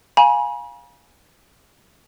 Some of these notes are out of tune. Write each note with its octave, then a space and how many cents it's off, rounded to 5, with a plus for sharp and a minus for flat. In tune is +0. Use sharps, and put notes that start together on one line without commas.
F5 +20 G#5 +0 B5 -45